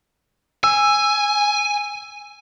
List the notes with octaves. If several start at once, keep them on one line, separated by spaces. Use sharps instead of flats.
G#5 E6